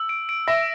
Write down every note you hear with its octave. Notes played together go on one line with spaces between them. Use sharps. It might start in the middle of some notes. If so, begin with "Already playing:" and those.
Already playing: E6
D7
D7
E5 A#6